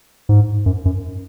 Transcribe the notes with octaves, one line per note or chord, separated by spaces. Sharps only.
G#2
F#2
F#2